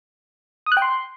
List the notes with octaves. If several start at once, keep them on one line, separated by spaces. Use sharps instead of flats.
D#6
F#6
G5
C6